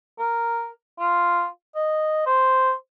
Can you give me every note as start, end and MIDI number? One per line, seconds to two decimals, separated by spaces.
0.19 0.69 70
0.99 1.46 65
1.76 2.23 75
2.26 2.72 72